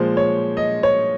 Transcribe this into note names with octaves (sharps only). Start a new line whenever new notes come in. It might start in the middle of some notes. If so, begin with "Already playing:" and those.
Already playing: A#2 F3 G#3 C5
C#5
D#5
C#5